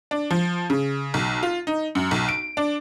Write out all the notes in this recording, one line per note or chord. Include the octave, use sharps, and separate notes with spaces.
D4
F3
C#3
B1
F4
D#4
F#2
B1
D7
D4